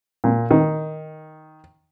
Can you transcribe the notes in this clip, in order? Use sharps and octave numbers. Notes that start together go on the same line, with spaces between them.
A#2
D#3